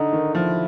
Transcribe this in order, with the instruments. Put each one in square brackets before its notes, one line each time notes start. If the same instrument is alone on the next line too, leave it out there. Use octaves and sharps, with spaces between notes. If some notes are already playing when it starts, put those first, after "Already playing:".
Already playing: [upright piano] D3 [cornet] D#4
[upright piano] D#3
[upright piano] F3 [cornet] E4